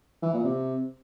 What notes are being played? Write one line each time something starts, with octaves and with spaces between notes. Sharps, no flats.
E3
A#2
C3